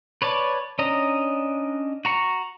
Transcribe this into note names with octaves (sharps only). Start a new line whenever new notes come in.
B4 C#5 D5 A5
C#4 D4 D#5 A#5
F#4 A#5 C#6